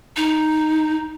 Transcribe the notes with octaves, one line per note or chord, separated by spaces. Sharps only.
D#4